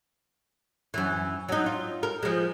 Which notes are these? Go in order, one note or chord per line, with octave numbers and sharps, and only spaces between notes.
F#2 E3
F#3 D#4
F4
A#4
F3 G#3